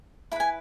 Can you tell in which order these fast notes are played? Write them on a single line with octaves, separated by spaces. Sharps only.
E4 B5 B4 G#5